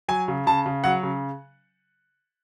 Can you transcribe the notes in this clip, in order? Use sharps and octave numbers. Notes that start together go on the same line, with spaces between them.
F#3 G#5
C#3
C#3 A5
C#3
F#3 F#5
C#3